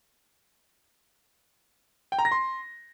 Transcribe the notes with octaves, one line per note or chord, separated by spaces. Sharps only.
G5
A#5
A#6
C6